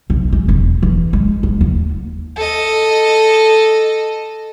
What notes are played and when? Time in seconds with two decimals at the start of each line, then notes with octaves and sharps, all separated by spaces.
0.10 B1
0.32 G#3
0.48 E1
0.83 E3
1.13 G#3
1.43 G#3
1.61 D#2
2.36 A4 D#5